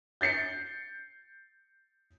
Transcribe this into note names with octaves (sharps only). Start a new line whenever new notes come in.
G6 A6 C7 C#7